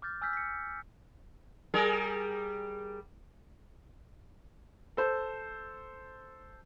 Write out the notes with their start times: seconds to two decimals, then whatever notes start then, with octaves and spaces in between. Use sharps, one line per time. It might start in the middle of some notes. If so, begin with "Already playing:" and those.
0.02 D6 F6 G6 A6
0.21 G#5 E6 F6 G6 B6
0.33 B6 C#7
1.74 G3 G#4 A#4
4.97 A4 C5